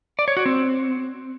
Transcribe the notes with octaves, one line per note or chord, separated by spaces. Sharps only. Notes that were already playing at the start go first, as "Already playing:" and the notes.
D5
C#5
F#4
C4